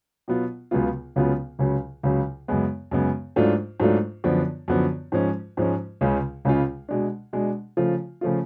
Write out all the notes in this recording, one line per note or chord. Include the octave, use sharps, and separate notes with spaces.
B2 F#3 B3 F4
C#2 C#3 F#3 B3 F4
C#2 C#3 F#3 B3 F4
C#2 C#3 F#3
C#2 C#3 F#3
F#2 C#3 G#3 B3
F#2 C#3 G#3 B3
G#2 F#3 A3 D4 F4
G#2 F#3 A3 D4 F4
F#2 D3 F3 B3 D4
F#2 D3 F3 B3 D4
G#2 F3 G#3 C#4
G#2 F3 G#3 C#4
C#2 C#3 G#3 C#4 F4
C#2 C#3 G#3 C#4 F4
B2 G#3 D4
B2 G#3 D4
C#3 F3 A3 F4
C#3 F3 A3 F4